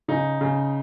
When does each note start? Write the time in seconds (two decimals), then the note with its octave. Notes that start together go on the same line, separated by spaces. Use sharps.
0.08 C#3 D#4
0.41 C#3